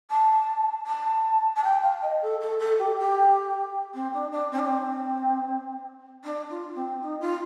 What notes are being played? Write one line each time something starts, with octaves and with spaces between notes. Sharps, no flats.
A5
A5
A5
G5
F5
D#5
A4
A4
A4
G4
G4
C4
D4
D4
C4
D4
C4
D4
F4
C4
D#4
F4